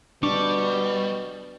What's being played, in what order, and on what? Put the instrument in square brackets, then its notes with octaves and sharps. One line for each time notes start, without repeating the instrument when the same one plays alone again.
[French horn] B2 [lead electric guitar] G3 [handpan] D4 [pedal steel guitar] C#6 D6